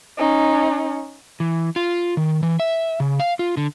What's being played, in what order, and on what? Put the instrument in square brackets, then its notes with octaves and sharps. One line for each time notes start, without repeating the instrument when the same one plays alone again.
[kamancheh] C#4 D#4
[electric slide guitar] E3
F4
D#3
E3
E5
C#3
F5
F4
D3